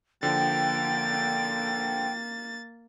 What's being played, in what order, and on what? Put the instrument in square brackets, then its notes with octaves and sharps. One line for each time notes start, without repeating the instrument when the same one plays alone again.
[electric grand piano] D3 F3 [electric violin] A#3 A6 [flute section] G5